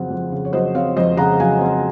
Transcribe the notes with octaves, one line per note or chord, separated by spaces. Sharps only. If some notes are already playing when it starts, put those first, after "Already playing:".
Already playing: F2 C#3 F#3 C4 F#5
F2
C#3
C#5
F#3 C5 D#5
C4 C#5 F5
F2 C5 D#5
C#3 F#5 A#5
F#3 F5 G#5
C4